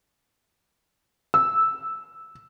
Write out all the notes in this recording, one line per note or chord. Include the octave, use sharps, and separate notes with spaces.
E6